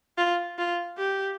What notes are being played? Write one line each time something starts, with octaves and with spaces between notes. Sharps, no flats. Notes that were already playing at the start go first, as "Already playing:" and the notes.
F4
F4
G4